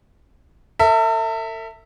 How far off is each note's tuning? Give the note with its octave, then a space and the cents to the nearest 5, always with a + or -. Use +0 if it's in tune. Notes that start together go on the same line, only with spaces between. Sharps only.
A4 +45 E5 -10